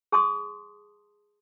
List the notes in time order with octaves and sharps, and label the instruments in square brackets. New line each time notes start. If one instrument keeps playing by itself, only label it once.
[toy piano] G#4 A5 C6 D#6